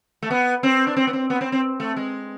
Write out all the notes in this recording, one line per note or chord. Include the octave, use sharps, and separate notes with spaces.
A3
B3
C4
D4
C4
B3
C4
B3
C4
C4
A3
G#3